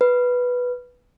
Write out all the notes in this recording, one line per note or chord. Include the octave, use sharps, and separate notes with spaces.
B4